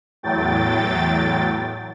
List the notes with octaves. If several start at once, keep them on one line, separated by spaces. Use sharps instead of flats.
E2 A2 F#3 G5 A6